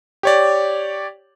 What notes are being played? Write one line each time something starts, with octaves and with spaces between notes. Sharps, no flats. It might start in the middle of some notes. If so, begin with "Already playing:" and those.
G4 C#5 D5